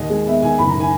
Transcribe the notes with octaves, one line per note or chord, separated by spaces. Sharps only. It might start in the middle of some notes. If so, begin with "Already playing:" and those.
Already playing: D#2 D#5
G#3
B3 E5
D#3 G#5
F#1 B5
A#5
D#3
G#5